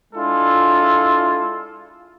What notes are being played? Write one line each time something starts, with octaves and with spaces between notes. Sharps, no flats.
G#3 D4 E4 F4 A4